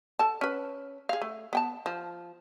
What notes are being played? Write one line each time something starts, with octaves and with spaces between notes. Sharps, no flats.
A4 A5
C#4 B4
G#4 F5
A3
B3 G5 A5
F3